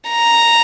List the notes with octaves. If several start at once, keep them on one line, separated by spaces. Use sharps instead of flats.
A#5